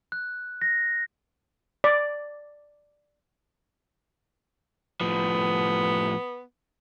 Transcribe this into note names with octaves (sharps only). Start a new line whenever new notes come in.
F#6
A#6
D5
A2 F3 B3